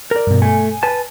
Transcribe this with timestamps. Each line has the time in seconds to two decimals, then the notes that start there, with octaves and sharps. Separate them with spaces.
0.11 A#4 D5
0.27 G2 B2
0.42 A3 G#5
0.83 B4 G#5 A5